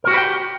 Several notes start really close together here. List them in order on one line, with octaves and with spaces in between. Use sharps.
A#4 F#4 G4 B4 G5